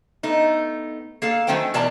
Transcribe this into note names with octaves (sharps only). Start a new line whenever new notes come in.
A3 B3 D#4
A#3 A4 F5
D#3 F#3 A3 C#4 C5 G5
B2 E3 A#4 D5 A5 A#5